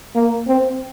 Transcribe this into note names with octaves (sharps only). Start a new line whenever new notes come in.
A#3
C4